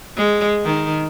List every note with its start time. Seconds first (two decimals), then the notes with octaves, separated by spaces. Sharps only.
0.16 G#3
0.65 D#3